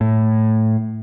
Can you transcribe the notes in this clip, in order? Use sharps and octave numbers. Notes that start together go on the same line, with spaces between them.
A2